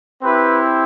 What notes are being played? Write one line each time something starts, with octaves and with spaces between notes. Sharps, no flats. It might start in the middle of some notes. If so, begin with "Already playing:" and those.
C4 E4 G4 B4